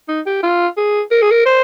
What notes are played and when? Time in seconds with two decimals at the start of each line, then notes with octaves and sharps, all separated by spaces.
0.09 D#4
0.26 G4
0.43 F4
0.77 G#4
1.11 A#4
1.22 G#4
1.31 A#4
1.46 C5